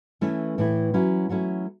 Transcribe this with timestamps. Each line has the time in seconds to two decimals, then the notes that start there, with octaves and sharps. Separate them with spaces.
0.21 E3 A3 C#4 E4
0.58 A2 E3 A3 E4
0.94 F#3 C#4 E4
1.29 F#3 A3 C#4 E4